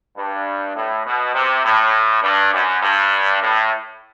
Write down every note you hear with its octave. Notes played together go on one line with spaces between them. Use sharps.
G2
A2
B2
C3
A2
G2
F#2
G2
A2